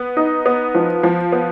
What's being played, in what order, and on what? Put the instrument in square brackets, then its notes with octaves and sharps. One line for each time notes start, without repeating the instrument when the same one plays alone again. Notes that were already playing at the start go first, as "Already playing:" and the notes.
Already playing: [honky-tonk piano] B3
D#4
B3
F3
F3
B3